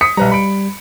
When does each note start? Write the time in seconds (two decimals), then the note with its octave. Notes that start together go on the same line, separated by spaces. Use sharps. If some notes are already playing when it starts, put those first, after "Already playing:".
0.01 D#6 B6 C#7
0.17 B1 G3 B4 A#5
0.32 B5 D7